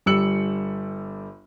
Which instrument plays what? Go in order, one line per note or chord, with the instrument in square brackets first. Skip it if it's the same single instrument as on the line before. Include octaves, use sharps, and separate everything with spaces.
[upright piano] G1 G3 E6 C#7 F#7